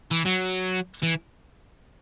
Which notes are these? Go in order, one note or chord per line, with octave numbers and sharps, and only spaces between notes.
E3
F#3
E3